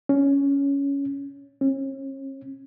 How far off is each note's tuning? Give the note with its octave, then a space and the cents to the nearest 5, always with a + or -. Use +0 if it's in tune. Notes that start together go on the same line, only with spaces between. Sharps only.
C#4 +10
C#4 -40